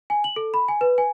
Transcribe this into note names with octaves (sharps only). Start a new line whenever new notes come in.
G#5
F#7
A4
B5
G#5
B4
G#5